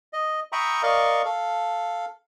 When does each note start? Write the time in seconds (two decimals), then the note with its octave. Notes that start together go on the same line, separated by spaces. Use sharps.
0.13 D#5
0.52 E5 G5 A#5 B5 C#6 D#6
0.83 A#4 D5 D#5 F5 C#6
1.25 A4 F5